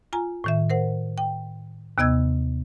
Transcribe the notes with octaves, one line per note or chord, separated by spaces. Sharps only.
F4 G#5 A#5
A2 D#3 E5
A#4 C5 F#5
G5
D#2 C3 B3 D#5 E6 G#6